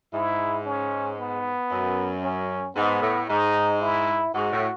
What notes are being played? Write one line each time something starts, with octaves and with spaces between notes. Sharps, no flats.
G#2 E4
C#4
B3
F#2
C#4
G#2 B3
A2
G#2 D#4
E4
G#2 F#4
A2